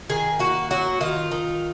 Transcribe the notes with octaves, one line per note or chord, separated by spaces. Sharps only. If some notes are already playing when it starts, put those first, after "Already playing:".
D#3 G#4
A#3 F#4
F#3 F#4
D#3 F4
D#3